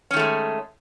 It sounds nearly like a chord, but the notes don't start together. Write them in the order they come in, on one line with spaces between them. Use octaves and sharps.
C#4 D#3 A3 G#3